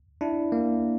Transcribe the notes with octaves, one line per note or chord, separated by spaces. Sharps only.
D4 E4
A#3